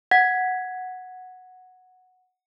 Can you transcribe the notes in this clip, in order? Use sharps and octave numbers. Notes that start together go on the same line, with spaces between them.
F#5 G#6 B6